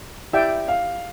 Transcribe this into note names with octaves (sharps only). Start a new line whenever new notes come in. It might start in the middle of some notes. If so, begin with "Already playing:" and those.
E4 G4 D5 E5 G5
F5